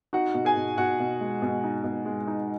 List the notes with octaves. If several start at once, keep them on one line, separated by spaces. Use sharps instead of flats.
D#4 F#4 F#5
B2
G#4 G#5
B2
B2 F#4 F#5
B2
G#3
B2
D#4
B2
G#3
D#4